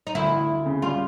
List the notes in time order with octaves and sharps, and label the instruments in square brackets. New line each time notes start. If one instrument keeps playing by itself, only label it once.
[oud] D#4
[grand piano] D2 [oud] E4
[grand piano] D2
D2
C#3
[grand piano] G3 [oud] F4